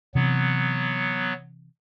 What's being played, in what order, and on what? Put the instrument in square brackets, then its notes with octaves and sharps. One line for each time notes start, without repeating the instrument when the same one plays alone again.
[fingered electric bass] C3 E3 [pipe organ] F#3 B3